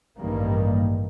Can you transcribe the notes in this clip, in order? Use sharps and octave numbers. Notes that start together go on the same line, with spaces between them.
A1 G2 D#3 G3 A#3